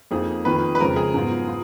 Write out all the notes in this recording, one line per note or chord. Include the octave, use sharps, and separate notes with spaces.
F2 F3 A#3 D#4 G#4
F2 D#3 A#3 F4 B4
B4
F2 C#3 F3 G#3 A#4
G#4
G#2 F#3 B3 F4
F4